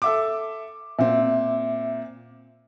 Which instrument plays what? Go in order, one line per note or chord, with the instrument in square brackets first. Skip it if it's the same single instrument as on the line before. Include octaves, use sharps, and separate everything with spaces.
[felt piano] A4 E5 D6
[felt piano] A#2 C4 [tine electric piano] E5